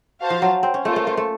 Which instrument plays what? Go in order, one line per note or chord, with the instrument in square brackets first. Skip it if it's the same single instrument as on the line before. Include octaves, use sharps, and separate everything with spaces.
[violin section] F#4 C5 F5 A5
[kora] F3
F#3
C4
C#4
[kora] A3 [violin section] A#3 F4 C5
[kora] A3
A3
A3